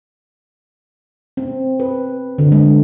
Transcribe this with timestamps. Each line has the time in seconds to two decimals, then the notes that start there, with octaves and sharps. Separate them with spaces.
1.37 C4
1.80 B4
2.38 D3
2.52 G#3